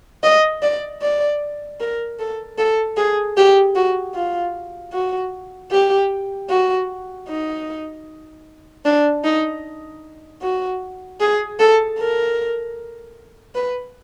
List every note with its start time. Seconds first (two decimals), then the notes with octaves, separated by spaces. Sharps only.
0.23 D#5
0.62 D5
1.02 D5
1.80 A#4
2.19 A4
2.58 A4
2.97 G#4
3.37 G4
3.75 F#4
4.15 F4
4.93 F#4
5.72 G4
6.50 F#4
7.28 D#4
8.85 D4
9.24 D#4
10.42 F#4
11.20 G#4
11.60 A4
11.99 A#4
13.55 B4